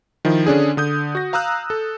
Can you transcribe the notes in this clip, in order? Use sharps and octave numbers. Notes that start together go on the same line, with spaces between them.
D#3 F3 E4
D3 C#4 D4 G#4
D3 D#6 G6
F#4 A#6
F5 A#5 D#6 E6 F#6
A4